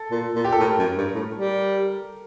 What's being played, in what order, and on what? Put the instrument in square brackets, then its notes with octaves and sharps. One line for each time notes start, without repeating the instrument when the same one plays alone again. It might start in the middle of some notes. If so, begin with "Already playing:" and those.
Already playing: [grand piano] A4
[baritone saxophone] A#2
A#2
[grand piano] G4
A4
[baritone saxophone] A2 [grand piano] A#4
[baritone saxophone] F#2
G2
A2
G3